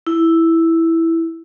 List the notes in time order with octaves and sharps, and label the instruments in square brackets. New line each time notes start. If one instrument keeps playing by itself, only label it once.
[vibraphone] E4